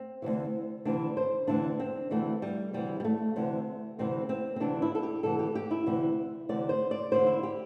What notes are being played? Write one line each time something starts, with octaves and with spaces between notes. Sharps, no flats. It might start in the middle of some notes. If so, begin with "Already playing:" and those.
Already playing: C4
D2 C3 E3
D2 C3 E3 D4
C5
D2 C3 E3 D4
C4
D2 C3 E3 A3
G3
D2 C3 E3 G3
G3
A3
D2 C3 E3
D2 C3 E3 C4
C4
C4
D2 C3 E3 D4
E4
A4
G4
D2 C3 E3 A4
G4
G4
E4
D2 C3 E3
D2 C3 E3 D5
C5
D5
E2 D3 C5
E4
G4